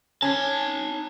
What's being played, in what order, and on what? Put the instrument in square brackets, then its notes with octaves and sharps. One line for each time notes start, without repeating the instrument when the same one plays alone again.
[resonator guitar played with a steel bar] C#4 [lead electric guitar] D#4 A5